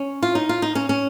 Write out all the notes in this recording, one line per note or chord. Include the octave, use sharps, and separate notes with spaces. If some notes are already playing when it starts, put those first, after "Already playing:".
Already playing: C#4
F4
D#4
F4
D#4
C#4
C#4